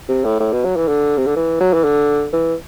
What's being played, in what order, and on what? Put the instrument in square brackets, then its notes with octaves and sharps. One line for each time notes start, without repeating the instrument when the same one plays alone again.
[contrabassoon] C3
A2
A2
B2
F#3
E3
D3
C3
D3
E3
F#3
E3
D3
E3